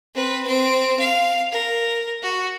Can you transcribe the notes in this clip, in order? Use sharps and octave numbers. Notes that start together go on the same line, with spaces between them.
C4 B4
C4 D7
F5
A#4
F#4